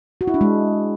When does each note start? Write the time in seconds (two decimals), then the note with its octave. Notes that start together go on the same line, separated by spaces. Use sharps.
0.21 F#4
0.27 E4
0.34 D4
0.41 G#3